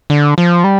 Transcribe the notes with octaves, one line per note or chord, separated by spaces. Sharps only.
D3
F3
G3